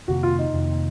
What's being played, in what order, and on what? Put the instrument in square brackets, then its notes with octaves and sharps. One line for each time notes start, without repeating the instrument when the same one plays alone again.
[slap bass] F2 C3 D#3 A#3 [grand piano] F#4
[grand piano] F4
D#4
[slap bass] F2 C3 D#3 A#3